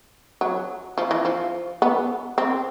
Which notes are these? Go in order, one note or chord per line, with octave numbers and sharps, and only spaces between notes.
F#3
F3
E3
F3
B3
C4